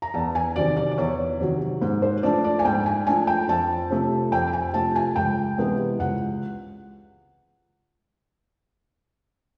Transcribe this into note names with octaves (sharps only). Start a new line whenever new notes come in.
A#5
E2 A5
G#5
C3 D#3 F#3 D5
D5
D5
E2 C#5
C3 D#3 F#3
G#2
C5
F3 A3 D4 D5
D5
G#5
G#2 G5
G#5
F3 A3 D4 G#5
G5
F2 A5
C3 F3 A3
F2 G5
G#5
C3 F3 A3 A5
G#5
C#2 G5
C3 E3 G#3 B3
C#2 F#5